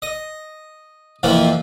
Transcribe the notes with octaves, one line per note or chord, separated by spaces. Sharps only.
D#5
F2 A#2 E3 F3 C4